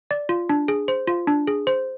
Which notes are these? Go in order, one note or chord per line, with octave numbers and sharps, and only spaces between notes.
D5
F4
D4
G#4
C5
F4
D4
G#4
C5